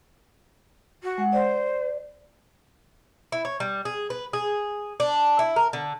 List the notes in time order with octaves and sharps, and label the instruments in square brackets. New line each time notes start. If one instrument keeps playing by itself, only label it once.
[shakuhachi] F#4
[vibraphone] G#3 F#5
[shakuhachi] C5 [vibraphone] D5
[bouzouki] E4
C#5
G3
G#4
B4
G#4
D4
E4
A#4
D3